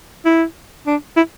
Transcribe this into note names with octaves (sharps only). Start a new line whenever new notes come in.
E4
D4
E4